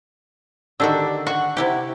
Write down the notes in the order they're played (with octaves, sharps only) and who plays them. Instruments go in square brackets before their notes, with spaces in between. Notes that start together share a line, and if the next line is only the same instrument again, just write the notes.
[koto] D3 D#3 F#4 [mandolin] D4 G4 E6
[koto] F#4 [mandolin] F#5 C#6
[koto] C3 E4 G4